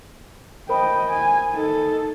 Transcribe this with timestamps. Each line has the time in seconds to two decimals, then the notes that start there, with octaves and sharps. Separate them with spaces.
0.69 A#4 C5 D#5 G5 B5
1.10 G#5
1.52 D#4 A4